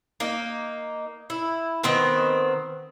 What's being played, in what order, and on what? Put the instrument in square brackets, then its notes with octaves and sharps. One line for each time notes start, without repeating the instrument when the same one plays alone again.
[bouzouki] A#3 D#4
E4
D#3 B3 C4 A#4